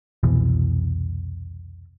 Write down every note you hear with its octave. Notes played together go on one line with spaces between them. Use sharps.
C2 F2 B2 E3